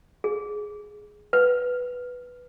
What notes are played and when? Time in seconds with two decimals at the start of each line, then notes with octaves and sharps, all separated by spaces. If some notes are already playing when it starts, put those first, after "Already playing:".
0.24 G#4
1.33 B4